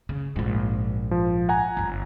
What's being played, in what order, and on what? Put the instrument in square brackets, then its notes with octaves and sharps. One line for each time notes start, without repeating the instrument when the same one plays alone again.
[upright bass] C#3
A#1 G#2
[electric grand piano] F3
F#5 G#5 A#5
[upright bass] G1 G2